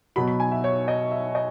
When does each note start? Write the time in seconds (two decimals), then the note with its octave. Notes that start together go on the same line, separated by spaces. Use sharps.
0.16 B2 F#3 B5
0.28 B5
0.40 G#5
0.52 E5
0.64 C#5
0.88 D#5
1.11 E5
1.35 D#5